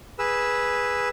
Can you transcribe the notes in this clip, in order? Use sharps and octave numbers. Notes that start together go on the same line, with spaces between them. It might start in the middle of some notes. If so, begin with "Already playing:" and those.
G#4 B4 E6